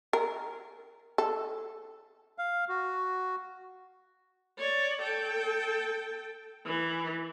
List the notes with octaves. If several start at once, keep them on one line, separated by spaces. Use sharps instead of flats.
A#4
A4
F5
F#4
C#5 D5
A4 G5
E3